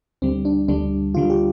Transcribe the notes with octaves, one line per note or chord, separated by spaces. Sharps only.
D2 D3 G3 C4
D4
D2 D3 G3 D4
D2 D3 G3 F4
G4